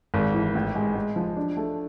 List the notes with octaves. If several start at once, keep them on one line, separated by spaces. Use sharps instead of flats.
G#1
E3
A1
G#3
G#3
F3
D4
A3